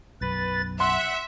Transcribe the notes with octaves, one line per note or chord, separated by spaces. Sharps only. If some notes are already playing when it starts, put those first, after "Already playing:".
B1 F#2 B4 A6
E5 F#5 C6